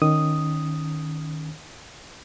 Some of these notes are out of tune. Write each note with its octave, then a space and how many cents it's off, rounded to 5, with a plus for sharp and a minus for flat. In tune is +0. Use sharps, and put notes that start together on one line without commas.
D#3 -10 C#4 +0 D#6 +0